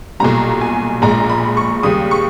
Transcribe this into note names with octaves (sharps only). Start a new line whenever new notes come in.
B1 A#2 G3 A#5
G#5
A#1 A#2 G#3 A#5
B5
C#6
D#2 C#3 G3 D#6
C#6